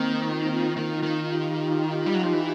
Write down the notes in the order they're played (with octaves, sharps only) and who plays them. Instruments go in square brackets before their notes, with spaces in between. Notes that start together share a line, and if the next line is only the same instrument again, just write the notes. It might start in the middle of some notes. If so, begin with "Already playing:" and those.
Already playing: [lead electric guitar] D#3 [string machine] A#3 C4
[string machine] D#4 F4
[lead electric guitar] D#3 [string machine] D#4 F4
[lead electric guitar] D#3
[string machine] F4 G4
[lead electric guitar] G3
F#3
F3
E3